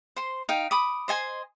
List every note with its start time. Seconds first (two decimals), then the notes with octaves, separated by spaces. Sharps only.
0.16 C5 C6
0.49 D#4 F5 G5
0.71 B5 D6 D#6
1.08 C5 D#5 G#5 C6